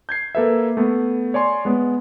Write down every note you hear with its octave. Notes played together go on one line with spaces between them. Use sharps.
G6 G#6 C7
A#3 A4 B4 E5
A3 B3
C#5 D5 G#5 C6
G#3 B3